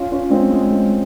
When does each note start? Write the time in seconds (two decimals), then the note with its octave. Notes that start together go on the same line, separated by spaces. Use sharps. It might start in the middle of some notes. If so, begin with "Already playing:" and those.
Already playing: C#4 F4
0.11 C#4 F4
0.30 G#3 C4
0.51 G#3
0.70 G#3